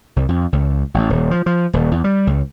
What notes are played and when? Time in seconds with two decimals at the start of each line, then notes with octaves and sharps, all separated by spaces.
0.16 C2
0.29 F2
0.52 C#2
0.94 A1
1.10 D#1
1.31 F3
1.46 F3
1.73 D#1
1.91 E2
2.04 G3
2.27 C#2